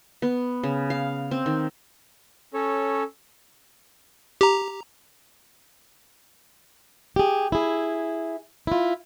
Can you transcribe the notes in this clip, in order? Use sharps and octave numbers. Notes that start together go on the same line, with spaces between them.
B3
C#3
F5
C4
D#3
C#4 A4 C#5
G4 A#5
G4 G#4
E4 G#4
E4 F4